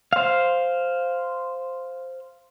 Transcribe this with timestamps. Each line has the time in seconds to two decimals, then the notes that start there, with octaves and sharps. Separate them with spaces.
0.13 C5 F5